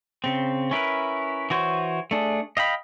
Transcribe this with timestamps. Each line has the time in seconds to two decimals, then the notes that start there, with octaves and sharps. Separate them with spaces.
0.24 C#3 C4
0.71 C#4 E4 A#4 B4
1.50 E3 F#4 C5 C#5
2.11 A3 D4 G#4
2.57 D#5 F5 G5 B5